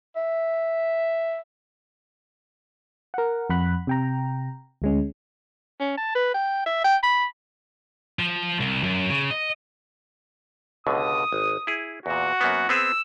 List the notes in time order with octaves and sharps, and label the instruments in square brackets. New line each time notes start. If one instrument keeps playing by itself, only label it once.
[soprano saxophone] E5
[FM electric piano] A#4 F#5
F2 F#5 B5 F#6
C3 G5 A#5
D2 G#3 C#4
[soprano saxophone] C#4
A5
B4
G5
E5
G5
B5
[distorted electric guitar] F3
C2
F#2
C#3
D#5
[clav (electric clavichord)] C#2 B2 D3 [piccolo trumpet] D#6
[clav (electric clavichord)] G#1
E4 G#4
[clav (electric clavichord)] E2 A#2 [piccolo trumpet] F#4
[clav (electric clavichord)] F#2 A#3 B3
[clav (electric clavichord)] B3 C4 G#4 [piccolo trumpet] E6